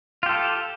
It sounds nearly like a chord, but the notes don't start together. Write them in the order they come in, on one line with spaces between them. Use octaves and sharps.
F4 G4 A4